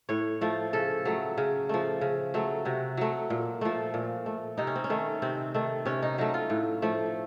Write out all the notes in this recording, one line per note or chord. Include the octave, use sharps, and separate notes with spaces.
A2 C#5
F3 A3
C#3 A4
F#3 A3
C#3
F3 A3
C#3
F#3 A3
C3 F#4
F#3 A3
A#2
F3 A3
A#2
A3
C3 D#4
C#4
C4
C#4
D#3 A3
C3 C4
D#3 A3
C3 C#4
D#4
F#3 A3 D#4
F4
A2
F3 A3